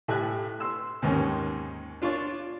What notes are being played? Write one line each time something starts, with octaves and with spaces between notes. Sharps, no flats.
A2 A3 G4 G#5 F#6
C6 E6
D#2 G#2 D#3 C#4
D4 F4 C#5 D5